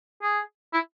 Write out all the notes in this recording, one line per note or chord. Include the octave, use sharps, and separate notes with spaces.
G#4
E4